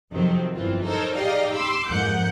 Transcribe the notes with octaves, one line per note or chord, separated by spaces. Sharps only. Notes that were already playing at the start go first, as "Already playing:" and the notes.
F2 C3 D#3 F#3 C4
G1 E3 C4 F4
D#4 A4 A#4 C5 C#5
D#4 G4 G#4 D5 D#5 F5
B5 C6 D6 E6
F2 G#2 A#3 F#5 G6